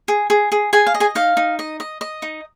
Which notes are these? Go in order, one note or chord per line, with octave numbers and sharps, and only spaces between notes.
G#4
G#4
G#4
G#4 G#5
F5
D#5
G#4 G#5
D#4 F5
D#4
D#5
D#5
D#5
D#4